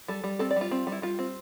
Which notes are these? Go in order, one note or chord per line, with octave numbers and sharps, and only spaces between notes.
G3 A4
G3
C4 A4
D5
G3 F4
C4
G3
E4
G3 F4
C4